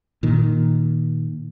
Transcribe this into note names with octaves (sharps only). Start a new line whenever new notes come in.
A#2 D#3